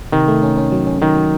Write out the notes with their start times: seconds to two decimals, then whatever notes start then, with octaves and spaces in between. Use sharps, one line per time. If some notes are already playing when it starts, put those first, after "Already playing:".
0.12 C3 D#3
0.28 A3
0.43 C#4
0.57 C#4
0.72 F#3
0.87 C#4
1.01 D#3 F#3
1.16 F#3